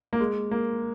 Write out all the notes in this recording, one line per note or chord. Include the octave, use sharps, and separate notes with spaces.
A#3
G#3
A#3